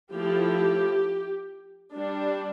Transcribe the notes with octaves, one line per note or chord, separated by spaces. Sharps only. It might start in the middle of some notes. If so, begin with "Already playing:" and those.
F3 A3 E4 G4
G3 D4